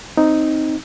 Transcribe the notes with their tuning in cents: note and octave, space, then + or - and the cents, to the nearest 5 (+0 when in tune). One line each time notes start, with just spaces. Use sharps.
C4 +0 D#4 +0